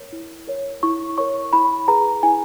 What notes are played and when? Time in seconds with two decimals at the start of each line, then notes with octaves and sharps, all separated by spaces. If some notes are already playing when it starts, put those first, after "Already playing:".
Already playing: A#4 C#5
0.13 E4
0.47 A#4 C#5
0.83 E4 C#6
1.18 A#4 C#5 C#6
1.53 E4 B5
1.88 G#4 B4 A#5
2.23 E4 G#5